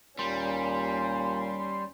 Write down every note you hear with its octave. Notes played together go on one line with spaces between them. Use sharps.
D#2 A#2 G3 C#4 C6